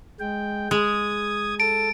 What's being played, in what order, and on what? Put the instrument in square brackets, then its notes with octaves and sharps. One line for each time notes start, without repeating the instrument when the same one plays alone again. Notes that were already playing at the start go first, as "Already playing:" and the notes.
[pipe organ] G#3 G5
[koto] G#3 [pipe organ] D#6 G#6
[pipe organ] A4 A5 [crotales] D7